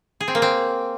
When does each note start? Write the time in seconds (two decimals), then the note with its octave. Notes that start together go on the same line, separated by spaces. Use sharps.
0.20 G#4
0.28 C4
0.35 A#3
0.42 C4